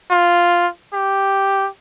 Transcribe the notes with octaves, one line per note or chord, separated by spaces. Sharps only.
F4
G4